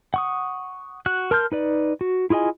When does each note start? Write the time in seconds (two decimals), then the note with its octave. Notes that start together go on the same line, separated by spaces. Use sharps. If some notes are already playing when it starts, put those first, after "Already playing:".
0.14 F#5 C#6 D#6
1.06 F#4 F#6
1.31 A#4 A5 C6 F6 G6
1.52 D#4 B4 D5
2.01 F#4
2.30 E4 F4 G#4 D#5 G#5